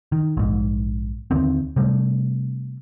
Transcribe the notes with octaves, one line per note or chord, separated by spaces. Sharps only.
D#3
A#1 G#2
D#2 D3 D#3 C4
C3 G3 A3